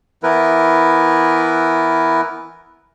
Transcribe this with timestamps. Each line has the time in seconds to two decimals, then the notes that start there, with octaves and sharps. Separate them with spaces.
0.23 E3 B3 E4 A#4 B4